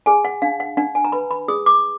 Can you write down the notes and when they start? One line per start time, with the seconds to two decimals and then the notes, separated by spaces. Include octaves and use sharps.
0.06 G#4 G#5
0.25 F#5
0.42 D4 F5
0.60 F#5
0.77 D4 F#5
0.95 G#5
1.05 A#5
1.12 B4 B5
1.31 B5
1.48 G#4 D#6
1.66 D6